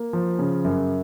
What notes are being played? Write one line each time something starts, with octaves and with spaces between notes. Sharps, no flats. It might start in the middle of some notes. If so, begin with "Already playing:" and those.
Already playing: A#3
F3
C#3
F#2